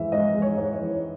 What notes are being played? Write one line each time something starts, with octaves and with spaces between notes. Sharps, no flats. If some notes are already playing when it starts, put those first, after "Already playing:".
Already playing: G#2 E3 G#3 E5
G#2 D#5
G#3
C#5
G#2
C#5
E3